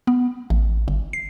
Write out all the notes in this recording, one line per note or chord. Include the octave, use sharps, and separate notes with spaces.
B3
A1
G1
C7